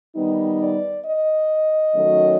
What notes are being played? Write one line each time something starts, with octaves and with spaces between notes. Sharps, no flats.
D#3 G3 B3 D#4
D5
D#5
D#3 F#3 A3 C#4